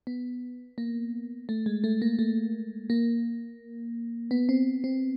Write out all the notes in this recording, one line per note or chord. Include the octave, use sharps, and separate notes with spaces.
B3
A#3
A3
G#3
A3
A#3
A3
A#3
B3
C4
C4